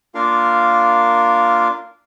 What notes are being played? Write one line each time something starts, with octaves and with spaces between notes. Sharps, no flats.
A#3 D4 F4 A#4 F5